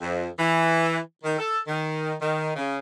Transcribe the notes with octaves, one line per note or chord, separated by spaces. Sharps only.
F2
E3
D#3
A4
D#3
D#3
C#3